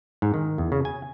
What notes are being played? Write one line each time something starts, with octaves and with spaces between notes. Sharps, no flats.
G#2
D#3
E2
C#3
G#5